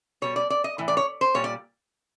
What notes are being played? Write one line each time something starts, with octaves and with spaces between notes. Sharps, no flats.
B2 G3 C#5
D5
D5
D#5
A2 E3
D5
C#5
C5
A#2 G3 C#5
D5